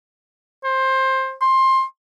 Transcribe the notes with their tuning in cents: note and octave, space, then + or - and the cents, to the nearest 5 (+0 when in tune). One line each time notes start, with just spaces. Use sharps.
C5 +20
C6 +20